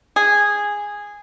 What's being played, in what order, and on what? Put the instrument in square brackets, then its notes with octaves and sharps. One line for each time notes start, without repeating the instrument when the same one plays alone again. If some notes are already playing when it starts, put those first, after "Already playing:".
[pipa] G#4